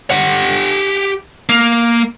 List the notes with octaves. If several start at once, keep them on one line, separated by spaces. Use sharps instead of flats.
G4 F#5
A#3